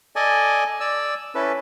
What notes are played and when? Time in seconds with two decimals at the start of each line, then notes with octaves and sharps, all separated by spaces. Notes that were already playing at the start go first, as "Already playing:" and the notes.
0.16 A4 D5 D#5 G#5
0.80 D5 E6
1.35 C#4 E4 A4 B4